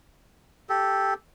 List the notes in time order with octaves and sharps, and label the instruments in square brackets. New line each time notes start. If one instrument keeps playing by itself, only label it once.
[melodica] G4 A4